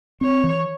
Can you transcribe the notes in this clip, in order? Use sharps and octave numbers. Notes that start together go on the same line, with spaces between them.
C4 C#5
E3